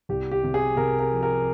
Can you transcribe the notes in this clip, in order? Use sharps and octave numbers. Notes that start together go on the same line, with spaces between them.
C2 G4
G4
C3
G#4
C3 A#4
A#4
F3
A#4